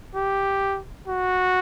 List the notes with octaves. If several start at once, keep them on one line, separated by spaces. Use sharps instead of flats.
G4
F#4